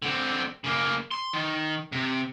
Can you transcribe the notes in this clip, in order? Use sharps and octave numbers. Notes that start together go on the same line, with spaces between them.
D3 C4
C#3 A#3
C6
D#3
C3